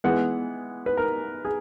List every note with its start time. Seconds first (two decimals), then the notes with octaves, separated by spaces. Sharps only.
0.04 E3 G#3 B3 F#5
0.86 B4
0.97 A#4
1.45 G#4